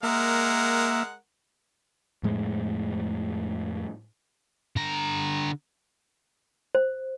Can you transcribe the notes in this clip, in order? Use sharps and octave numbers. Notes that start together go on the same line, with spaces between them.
G#3 A#3 A#4 E5 F#5
F2 A2 G#3
D3 A#5
C5